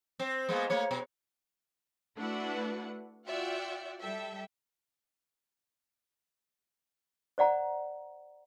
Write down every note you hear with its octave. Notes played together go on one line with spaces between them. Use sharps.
C4
G#3 A#3 B3
A3 A#3 C#5
B2
A3 D4 E4 F#4 B4 F#5
F4 F#4 D5 E5 F#5 G5
G3 A4 E5 G5
C5 D5 F#5 A#5